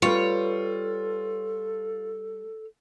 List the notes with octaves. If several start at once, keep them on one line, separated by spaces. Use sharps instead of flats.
G3 F4 A4 B4 C#5